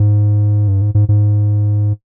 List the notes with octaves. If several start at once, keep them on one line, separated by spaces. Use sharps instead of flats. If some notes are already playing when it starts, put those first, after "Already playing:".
Already playing: G#2
G2
G#2
G#2
G#2